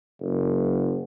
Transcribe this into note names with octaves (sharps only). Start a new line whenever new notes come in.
F#1